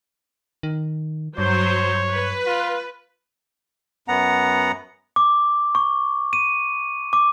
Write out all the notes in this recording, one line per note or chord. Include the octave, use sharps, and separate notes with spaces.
D#3
G2 F#3 C5 C#5
B4
F4
F#2 B3 F#5 A#5
D6
C#6
D#7
D6